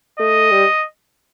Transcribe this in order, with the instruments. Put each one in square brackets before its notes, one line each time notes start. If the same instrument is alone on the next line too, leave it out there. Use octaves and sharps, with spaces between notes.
[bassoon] A3 [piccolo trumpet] D#5
[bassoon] G3